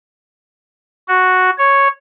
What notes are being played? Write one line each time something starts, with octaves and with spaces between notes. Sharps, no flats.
F#4
C#5